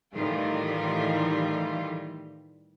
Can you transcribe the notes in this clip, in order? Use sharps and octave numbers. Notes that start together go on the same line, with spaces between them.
A2 D#3 E3 G3 F4